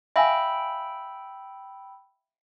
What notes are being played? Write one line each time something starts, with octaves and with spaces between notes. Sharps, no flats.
E5 F5 G5 G#5 B5 E6